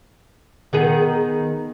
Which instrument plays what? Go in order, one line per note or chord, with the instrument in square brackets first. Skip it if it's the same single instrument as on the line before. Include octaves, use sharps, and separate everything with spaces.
[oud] D#3 B3 G#4